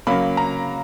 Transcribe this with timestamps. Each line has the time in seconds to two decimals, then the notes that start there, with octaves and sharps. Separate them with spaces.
0.07 C#3 F#3 A#3 B5
0.37 A#5